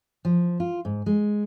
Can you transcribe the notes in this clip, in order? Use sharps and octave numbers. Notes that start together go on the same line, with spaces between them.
F3
F4
G#2
G#3